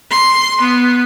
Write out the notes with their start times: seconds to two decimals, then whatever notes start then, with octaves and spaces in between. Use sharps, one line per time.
0.11 C6
0.61 B3